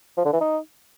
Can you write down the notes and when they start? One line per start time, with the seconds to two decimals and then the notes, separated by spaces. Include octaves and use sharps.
0.17 F3
0.25 D3
0.33 E3
0.41 D#4